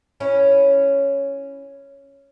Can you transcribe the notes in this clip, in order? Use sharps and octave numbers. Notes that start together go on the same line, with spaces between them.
C#4 E4 C#5